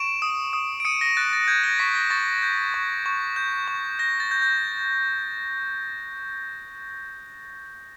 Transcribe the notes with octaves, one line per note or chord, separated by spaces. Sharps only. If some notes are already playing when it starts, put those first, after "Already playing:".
Already playing: C#6 D7 E7
D#6
D#6
D7
D#6 C#7 D#7
A#6
F#6 A6
A6
G6 G#6
A#6
C#6 B6
A#6
C#6 A6
G6
C#6
C#6
G6
C#6
G6 A#6
A6
G6
G6